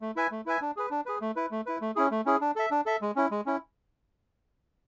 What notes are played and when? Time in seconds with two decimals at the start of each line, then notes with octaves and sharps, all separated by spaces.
0.01 A3
0.16 E4 B4 E5 G#5
0.31 A3
0.46 E4 B4 E5 G#5
0.61 D4
0.76 G#4 B4
0.91 D4
1.06 G#4 B4
1.21 A3
1.36 E4 B4
1.51 A3
1.66 E4 B4
1.81 A3
1.96 C#4 E4 G#4
2.11 A3
2.26 C#4 E4 G#4
2.41 D4
2.56 A4 E5
2.71 D4
2.86 A4 E5
3.01 G#3
3.16 C#4 E4
3.31 G#3
3.46 C#4 E4